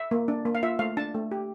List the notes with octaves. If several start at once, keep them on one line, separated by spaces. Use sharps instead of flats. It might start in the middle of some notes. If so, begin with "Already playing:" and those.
Already playing: E5
A#3
D4
A#3
F5
F4 E5
A3 F5
D4 A5
A3
G4